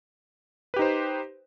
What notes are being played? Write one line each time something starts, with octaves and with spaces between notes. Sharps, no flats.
D#4 G4 B4 C5